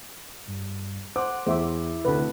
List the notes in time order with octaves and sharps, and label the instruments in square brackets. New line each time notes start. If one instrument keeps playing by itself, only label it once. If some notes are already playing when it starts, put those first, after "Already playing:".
[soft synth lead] G2
[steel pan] C5 [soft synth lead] F#5 [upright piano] D6
[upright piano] E2 [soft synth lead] E4 [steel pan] C5 E5 D6
[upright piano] F1 D2 [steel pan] B4